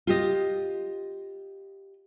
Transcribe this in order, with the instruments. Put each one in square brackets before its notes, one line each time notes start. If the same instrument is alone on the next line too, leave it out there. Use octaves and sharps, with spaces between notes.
[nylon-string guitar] F4 G4 D#5